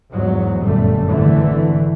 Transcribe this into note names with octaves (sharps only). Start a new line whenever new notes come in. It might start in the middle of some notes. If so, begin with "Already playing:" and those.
E2 G#2 F#3
G1 F#2 A#2 D3 G3 A3
G#1 D3 E3 A3